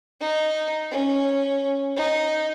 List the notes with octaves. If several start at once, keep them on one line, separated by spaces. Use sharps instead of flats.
D#4
C#4
D#4